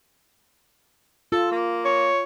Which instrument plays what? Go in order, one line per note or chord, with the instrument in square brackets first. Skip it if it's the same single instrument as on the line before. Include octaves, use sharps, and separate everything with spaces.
[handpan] F4 [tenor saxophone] A4
[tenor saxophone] A#3
[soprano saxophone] C#5